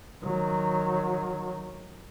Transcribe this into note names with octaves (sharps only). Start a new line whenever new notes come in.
D#3 F#3